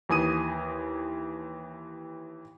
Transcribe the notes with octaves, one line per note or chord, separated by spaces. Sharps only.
D#2 E3 G#5 D#6 D#7